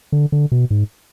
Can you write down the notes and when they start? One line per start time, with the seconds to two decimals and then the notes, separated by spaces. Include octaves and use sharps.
0.12 D3
0.32 D3
0.52 B2
0.71 G#2